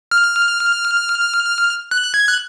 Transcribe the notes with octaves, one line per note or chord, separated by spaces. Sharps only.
F6
F#6
G#6
F#6